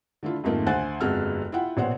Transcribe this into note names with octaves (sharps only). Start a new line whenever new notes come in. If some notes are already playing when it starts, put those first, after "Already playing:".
D3 A3 E4 F4
F2 G#2 D#3 A3 A#3 F4
D2 C5 F#5 G#5 F#6 A6
G1 F2 G#3 F#4 A4 F6
E4 F4 F#5 G5
A#1 B2 C5 C#5 F#5